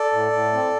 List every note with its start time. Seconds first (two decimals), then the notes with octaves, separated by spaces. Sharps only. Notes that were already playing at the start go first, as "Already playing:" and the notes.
Already playing: A4 D5
0.13 A2
0.33 A2
0.53 C4